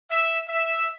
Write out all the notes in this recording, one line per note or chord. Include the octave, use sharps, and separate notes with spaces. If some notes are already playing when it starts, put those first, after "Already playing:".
E5
E5